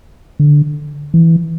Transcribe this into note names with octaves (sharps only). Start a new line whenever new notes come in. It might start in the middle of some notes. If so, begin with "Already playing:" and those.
D3
E3